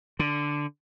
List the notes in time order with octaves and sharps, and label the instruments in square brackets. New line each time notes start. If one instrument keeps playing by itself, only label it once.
[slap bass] D3